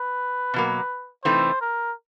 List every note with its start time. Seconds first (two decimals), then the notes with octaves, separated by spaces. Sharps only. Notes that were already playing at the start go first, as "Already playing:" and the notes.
Already playing: B4
0.54 B2 F#3 A#3
1.24 C3 E3 A3 C4 D#4 C5
1.61 A#4